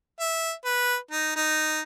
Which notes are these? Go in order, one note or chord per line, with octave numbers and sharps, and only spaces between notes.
E5
B4
D#4
D#4